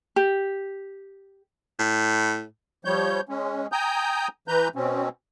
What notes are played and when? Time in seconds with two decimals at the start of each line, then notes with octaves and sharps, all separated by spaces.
0.16 G4
1.79 A2
2.85 F3 G3 C#5 G6
3.29 G#3 C#4
3.72 G5 G#5 A#5 D#6 G6
4.48 E3 B4 A#5 G6
4.76 B2 C4 C#4